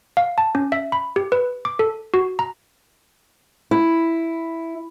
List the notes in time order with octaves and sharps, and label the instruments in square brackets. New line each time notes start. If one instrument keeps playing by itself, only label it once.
[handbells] F5
A5
C#4
E5
B5
G4
B4
D6
A4
F#4
A#5
[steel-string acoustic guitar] E4